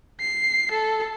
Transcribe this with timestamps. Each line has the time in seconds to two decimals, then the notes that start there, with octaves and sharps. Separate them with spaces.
0.20 C7
0.71 A4